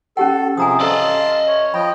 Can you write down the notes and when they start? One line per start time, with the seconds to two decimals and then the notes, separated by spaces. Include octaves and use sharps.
0.17 C#4 G4 A4 F#5
0.57 C3 F3 G#4 G#5 A#5 D#6
0.80 A4 D5 D#5 F5 A5 C6 E6
1.48 C#5
1.74 F3 D#5 G5 B5